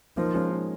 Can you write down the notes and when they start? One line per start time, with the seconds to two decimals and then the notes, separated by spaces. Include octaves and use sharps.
0.17 F3 A#3 D#4
0.34 G#3 C#4
0.51 A#3 D#4